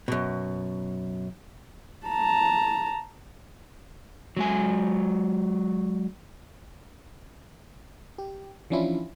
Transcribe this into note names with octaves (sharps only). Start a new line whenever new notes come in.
F#2 B2
A5 A#5
F#3 G#3 G#5
G4
E3 F3 C#4 D4 E4 F4